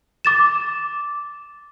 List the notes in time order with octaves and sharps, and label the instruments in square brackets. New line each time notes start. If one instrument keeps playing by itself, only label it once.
[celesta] D6 A6 E7